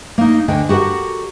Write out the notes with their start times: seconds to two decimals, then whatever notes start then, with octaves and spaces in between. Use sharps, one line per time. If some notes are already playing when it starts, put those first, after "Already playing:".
0.18 A#3 D#4
0.48 D2 D3 D#5 G5 G#5
0.69 F#4 G4 A4 A#4 F#5